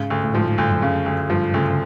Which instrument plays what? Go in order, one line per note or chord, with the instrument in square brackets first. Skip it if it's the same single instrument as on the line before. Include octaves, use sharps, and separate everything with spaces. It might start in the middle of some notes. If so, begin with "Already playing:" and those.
Already playing: [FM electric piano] G#2 [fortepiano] C#3
[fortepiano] D2
[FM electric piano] A2
[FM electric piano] G#2 [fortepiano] F3
[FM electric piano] G#2
[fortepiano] D2 [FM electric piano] G2
[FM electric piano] F#2
[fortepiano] C#3
D2
[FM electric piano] G2 [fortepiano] F3
[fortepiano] D2 [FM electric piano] C#3